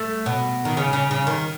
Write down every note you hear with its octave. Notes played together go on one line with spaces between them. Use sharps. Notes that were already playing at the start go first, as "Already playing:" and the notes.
Already playing: A3
B2
D#3
C#3
C#3
C#3
D#3